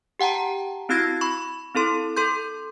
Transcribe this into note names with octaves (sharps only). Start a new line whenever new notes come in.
G4 F#5 G5 A5 A#5
C4 E4 F#4 E6 G#6 A#6
B5 C#6
C4 E4 A4 C6
A4 C6 G6